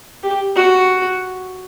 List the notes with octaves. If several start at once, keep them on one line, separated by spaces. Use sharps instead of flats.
G4
F#4